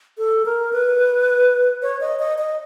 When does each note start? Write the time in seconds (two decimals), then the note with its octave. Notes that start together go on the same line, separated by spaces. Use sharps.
0.18 A4
0.45 A#4
0.73 B4
1.82 C#5
2.01 D#5
2.19 D#5
2.38 D#5